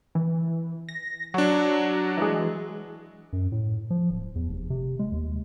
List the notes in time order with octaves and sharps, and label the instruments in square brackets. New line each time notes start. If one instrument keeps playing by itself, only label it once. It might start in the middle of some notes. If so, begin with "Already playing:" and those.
[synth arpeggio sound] E3
A#6
[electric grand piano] F#3 D4 [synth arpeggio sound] F#4
[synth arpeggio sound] E3 G#3
[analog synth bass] F#2
A2
F3
D1
E2
F1
C3
G#3
D#2